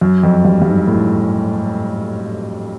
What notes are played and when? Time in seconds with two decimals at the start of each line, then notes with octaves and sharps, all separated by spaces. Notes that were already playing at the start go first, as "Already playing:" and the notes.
0.01 F#2
0.23 F2
0.45 G2
0.62 G2
0.66 G#2
0.87 A2